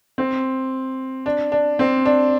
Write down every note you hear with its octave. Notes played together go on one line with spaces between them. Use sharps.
C4
D4
D4
C4
D4